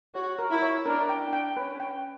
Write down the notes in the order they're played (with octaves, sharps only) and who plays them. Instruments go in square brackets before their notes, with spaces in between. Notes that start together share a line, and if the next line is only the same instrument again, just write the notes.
[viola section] F#4 [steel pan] C#5
[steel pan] A#4
[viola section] E4
[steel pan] C#5
[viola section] D4 [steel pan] A#4
[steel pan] G5
[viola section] D4
[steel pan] G5
[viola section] C#4 [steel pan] B4
[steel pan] G5